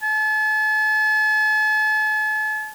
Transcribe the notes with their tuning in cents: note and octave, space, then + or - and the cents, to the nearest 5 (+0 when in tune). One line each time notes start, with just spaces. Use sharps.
A5 -40